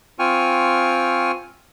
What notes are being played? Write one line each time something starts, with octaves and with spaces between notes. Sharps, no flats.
C4 F4 G5 G#5 C#6 F6